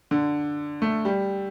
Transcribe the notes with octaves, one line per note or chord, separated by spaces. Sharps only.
D3
A3
G3